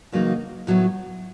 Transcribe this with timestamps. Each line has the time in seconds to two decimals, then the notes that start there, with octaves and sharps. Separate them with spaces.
0.12 E2 C#3 F#3 A#3 D#4
0.67 A2 F#3 B3